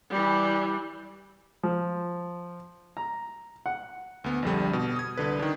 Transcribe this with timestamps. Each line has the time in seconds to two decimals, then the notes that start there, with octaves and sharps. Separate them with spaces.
0.10 E3 G3
1.63 F3
2.97 A#5
3.66 F#5
4.24 D2 B3
4.43 A#1 F2 D3 G3
4.73 B2
4.96 D#6 G#6
5.17 C2 D3 B4
5.39 D#3 D4